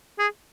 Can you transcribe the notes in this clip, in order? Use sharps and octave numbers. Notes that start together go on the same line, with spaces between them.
G#4